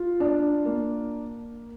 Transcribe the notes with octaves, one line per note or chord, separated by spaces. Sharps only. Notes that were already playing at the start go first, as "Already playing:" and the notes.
Already playing: F4
D4
A#3